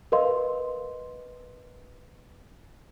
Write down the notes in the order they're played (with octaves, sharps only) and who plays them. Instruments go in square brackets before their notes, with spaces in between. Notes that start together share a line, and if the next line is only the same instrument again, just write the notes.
[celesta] A#4 B4 D#5 F5 C6